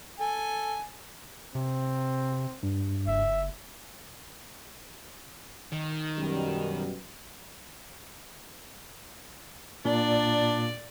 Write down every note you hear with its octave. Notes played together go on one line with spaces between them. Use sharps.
A4 G#5
C3 C4
G2
F#1 E5
D#3
F#2 B2 G3
A#2 D4 D5